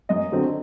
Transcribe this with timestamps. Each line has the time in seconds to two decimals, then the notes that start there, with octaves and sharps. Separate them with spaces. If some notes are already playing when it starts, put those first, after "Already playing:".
0.09 F#2 D#5
0.32 D3 F#3 C4